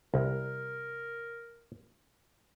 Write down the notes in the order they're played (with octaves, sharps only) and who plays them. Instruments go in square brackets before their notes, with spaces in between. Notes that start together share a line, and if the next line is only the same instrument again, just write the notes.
[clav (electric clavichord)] C2 [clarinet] A#4